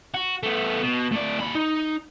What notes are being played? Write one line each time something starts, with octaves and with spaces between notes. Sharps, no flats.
F#4
A3 B3
B2
A2 D5
D#2 B5
D#4